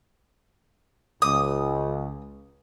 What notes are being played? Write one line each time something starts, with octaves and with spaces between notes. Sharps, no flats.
C#2 D#6